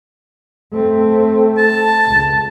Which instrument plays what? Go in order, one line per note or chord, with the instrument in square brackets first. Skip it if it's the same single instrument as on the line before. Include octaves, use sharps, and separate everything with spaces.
[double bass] A3 C4
[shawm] A5
[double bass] C#2